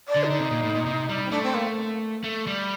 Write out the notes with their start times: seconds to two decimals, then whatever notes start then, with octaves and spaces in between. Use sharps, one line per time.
0.08 D5
0.16 D3
0.24 D#4
0.30 D3
0.40 C3
0.51 A#2
0.63 A2
0.75 A#2
0.86 C3
1.09 G3
1.26 C4
1.31 A3 D4
1.43 C4
1.55 A#3
2.24 A3
2.47 G3